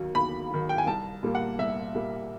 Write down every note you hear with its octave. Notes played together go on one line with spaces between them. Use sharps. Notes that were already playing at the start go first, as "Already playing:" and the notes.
Already playing: D#2 D#3 F#3
D#2 B5
D#3 F#3
G5
G#5
C2 A5
A#2 G3 A#3
F#5
C2 E5
A#2 G3 A#3